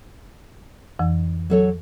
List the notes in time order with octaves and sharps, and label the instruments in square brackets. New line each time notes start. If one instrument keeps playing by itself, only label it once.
[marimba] F2 E3
[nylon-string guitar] F#3 A4 C#5